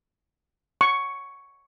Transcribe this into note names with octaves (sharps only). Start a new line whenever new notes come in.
C#6